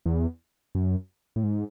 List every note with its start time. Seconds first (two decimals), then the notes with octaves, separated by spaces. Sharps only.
0.06 E2
0.75 F#2
1.36 A2
1.43 G#2